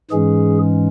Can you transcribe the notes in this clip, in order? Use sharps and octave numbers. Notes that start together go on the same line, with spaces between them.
G#2 E3 G#3 C#4 G#4